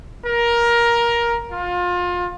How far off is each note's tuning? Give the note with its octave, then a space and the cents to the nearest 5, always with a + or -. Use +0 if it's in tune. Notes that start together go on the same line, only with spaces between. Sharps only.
A#4 +15
F4 +25